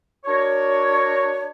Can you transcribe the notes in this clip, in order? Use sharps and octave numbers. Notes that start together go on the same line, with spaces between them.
D4 F#4 A#4 C#5